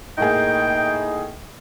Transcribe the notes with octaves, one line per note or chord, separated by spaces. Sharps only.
A2 A#3 D#4 G#4 G5